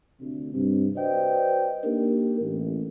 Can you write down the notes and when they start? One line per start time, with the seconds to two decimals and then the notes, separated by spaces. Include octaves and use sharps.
0.20 D2 C3
0.53 G2 C3
0.96 F#4 B4 C5 D5 D#5 G5
1.84 A#3 D4 D#4 G4 A#4
2.40 A1